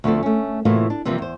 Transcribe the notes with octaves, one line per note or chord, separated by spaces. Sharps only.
D2 F3 A3 B3 C4 A4
A3 C#4
A2 C3 E3 A#3 F4 F#4
D4
C3 E3 F3 G3 A#3 C4
E2 C5